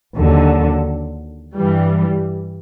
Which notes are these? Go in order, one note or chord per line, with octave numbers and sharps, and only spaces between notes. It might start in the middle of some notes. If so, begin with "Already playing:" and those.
D#2 D3 F#3
G2 E3 G3